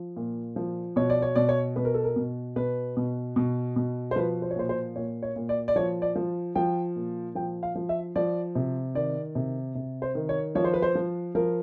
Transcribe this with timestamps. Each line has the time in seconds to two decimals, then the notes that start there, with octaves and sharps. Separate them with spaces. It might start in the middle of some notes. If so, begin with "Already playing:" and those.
Already playing: F3
0.16 A#2
0.56 F3
0.96 B2 C#5
1.10 D5
1.22 C#5
1.35 B2 D5
1.49 C#5
1.76 B2 B4
1.85 A#4
1.94 A4
2.04 A#4
2.16 B2
2.56 B2 B4
2.97 B2
3.36 B2
3.76 B2
4.11 C5
4.16 F3 B4
4.42 C5
4.51 C#5
4.56 A#2 C5
4.69 C5
4.96 A#2 C#5
5.23 C#5
5.36 A#2
5.49 D5
5.68 D5
5.76 F3 C#5
6.02 D5
6.16 F3
6.55 F3 G5
6.96 A#2
7.35 F3 G5
7.63 F5
7.75 F3
7.89 E5
8.16 F3 D5
8.55 C3
8.95 D#3 D5
9.35 C3
9.75 C3
10.02 C5
10.15 D#3
10.29 C#5
10.55 F3 C#5
10.64 C5
10.74 B4
10.82 C5
10.95 F3
11.35 F3 A#4